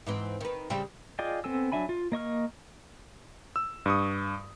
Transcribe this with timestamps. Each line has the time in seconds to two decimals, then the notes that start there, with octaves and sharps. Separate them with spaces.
0.07 G#2 E3 C4
0.41 D#3 B4
0.70 C#3 G3 C4
1.19 F4 G#4 D5 D#5 G5
1.44 B3 C4 A4 G#5 E6
1.72 F#3 D4 E5 G#5 B5
1.89 F4
2.12 A#3 D#5 C#6 F6
3.56 E6
3.86 G2 C#6 D#6